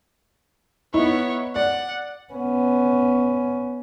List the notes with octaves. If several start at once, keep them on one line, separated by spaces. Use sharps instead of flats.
B3 D#4 E4 C#5
D5 F#5
B3 C#4